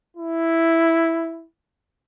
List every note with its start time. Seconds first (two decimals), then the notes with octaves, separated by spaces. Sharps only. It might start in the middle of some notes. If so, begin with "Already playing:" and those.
0.17 E4